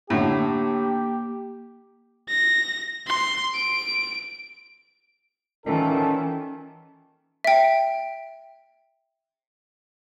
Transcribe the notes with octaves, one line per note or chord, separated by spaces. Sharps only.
A2 D3 A#3 G4
A#6
C6
D7
A#2 D#3 E3 C#4 A4
E5 G5